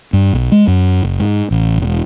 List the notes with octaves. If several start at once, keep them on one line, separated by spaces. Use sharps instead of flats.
G2
B1
G#3
F#2
F#1
G#2
A1
E1